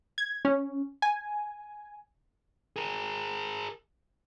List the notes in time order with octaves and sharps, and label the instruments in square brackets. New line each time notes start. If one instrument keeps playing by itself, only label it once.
[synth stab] G#6
C#4
G#5
[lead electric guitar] G#4 A#4